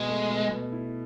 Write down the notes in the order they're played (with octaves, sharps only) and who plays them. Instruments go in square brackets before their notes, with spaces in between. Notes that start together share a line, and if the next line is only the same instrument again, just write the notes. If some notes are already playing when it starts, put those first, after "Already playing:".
Already playing: [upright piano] B2 [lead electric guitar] G#3
[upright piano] A3
B2
B2
E4